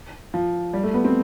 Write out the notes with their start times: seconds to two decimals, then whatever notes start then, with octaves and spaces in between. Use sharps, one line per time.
0.34 F3
0.74 G3
0.83 A3
0.94 B3
1.05 C4